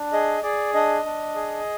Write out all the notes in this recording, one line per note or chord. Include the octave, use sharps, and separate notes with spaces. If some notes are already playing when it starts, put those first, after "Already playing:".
Already playing: D4
G#4 D#5
G#4 D5
D4 D#5
D4
G#4